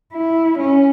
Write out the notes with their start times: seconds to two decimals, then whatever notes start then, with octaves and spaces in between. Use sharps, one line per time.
0.13 E4
0.59 C#4